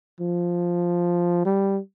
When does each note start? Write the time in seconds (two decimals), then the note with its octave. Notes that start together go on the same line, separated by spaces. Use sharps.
0.21 F3
1.46 G3